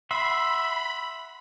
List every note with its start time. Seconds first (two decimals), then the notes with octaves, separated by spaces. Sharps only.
0.11 E5 F#5 B5 C6